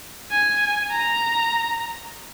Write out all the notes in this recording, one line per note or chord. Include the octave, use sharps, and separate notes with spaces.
G#5
A#5